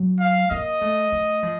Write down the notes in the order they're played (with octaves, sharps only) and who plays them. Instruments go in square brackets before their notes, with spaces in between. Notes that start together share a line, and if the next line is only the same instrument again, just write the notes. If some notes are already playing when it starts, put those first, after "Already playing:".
Already playing: [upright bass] F#3
[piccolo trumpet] F5
[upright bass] A#3 [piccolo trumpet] D#5
[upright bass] A3
A3
F3